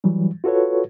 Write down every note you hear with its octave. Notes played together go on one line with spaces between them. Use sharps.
E3 F#3 G3
F4 F#4 A4 B4 C#5